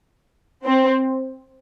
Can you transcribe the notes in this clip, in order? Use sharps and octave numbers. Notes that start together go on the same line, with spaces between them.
C4